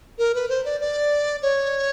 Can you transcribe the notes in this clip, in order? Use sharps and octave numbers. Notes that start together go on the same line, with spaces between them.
A#4
B4
C5
D5
D5
C#5